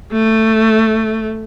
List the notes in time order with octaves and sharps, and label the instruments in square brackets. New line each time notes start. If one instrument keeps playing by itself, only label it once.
[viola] A3